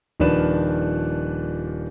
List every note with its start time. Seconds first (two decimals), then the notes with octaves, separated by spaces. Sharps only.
0.20 D#1 D#3 F3 D4 B4 E7